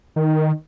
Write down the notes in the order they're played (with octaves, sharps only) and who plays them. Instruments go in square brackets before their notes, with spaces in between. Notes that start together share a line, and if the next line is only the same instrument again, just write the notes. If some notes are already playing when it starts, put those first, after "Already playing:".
[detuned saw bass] D#3